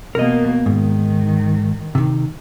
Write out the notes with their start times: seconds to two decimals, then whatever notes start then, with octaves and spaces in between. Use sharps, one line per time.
0.15 B2 A#3 A#4 D#5
0.66 G#2 D#3
1.95 C3 D#3